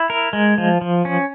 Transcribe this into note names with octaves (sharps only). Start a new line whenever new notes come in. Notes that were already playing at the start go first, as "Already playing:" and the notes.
Already playing: E4
A#4
G#3
F3
F3
C#4